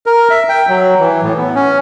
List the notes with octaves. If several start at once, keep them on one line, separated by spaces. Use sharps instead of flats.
A#4
E5
G5
F#3
E3
A2
B3
C#4